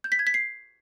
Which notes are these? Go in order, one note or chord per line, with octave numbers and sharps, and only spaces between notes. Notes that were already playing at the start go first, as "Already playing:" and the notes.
G6
B6
G#6
B6
C7